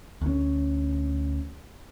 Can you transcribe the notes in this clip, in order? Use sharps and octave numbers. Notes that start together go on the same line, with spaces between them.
D2 C#4